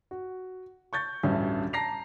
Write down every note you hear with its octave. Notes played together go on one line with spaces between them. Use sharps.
F#4
C#6 G6 A6
A1 D2 G2 C#4 E5
A5 A#5 A#6 C7 F7